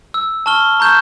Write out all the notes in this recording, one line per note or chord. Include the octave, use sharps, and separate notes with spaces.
E6
A5 C#6 F6 G7
A#5 C#6 G6 G#6 E7